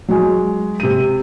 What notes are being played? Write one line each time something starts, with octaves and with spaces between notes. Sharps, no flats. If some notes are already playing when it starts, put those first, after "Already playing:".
F#3 G#3
C3 D#7